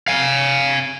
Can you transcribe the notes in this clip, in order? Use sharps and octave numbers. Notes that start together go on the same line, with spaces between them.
F5 G#5